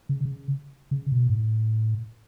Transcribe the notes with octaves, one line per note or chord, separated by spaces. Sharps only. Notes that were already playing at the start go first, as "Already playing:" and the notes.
C#3
C#3
C#3
B2
G#2
A2